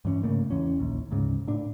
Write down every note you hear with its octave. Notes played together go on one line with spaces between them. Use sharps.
G2 E3 C4 C#4
G#2 C#3 A3 A#3
E2 E3 C#4
A#1 D#2
D2 G#2 C#3
A2 D4